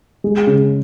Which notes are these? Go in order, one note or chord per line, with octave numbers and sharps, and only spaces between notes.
G#3
C#3